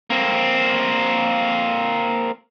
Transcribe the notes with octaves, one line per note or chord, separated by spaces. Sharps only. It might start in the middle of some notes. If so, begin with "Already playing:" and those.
A#3 C4